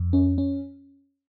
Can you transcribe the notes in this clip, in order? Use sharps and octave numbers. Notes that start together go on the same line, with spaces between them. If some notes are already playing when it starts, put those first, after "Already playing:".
Already playing: F2
C#4
C#4